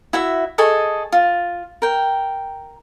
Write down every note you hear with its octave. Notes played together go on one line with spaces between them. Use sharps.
E4 F#4 E5
G#4 A4 D#5 C#6
F4
A#4 G5